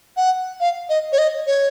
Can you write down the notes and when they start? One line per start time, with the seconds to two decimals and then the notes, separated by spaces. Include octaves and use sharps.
0.17 F#5
0.60 F5
0.89 D#5
1.12 C#5
1.18 D#5
1.47 C#5